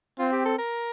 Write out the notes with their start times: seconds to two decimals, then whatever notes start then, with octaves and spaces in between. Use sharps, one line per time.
0.19 C4 F4
0.32 G4
0.45 A4
0.58 A#4